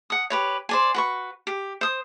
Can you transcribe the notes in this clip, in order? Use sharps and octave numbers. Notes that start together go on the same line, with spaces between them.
F#5 D#6
G4 B4 C#5
C5 D5 G#5
F#4 B4 C#6
G4
C5 D#6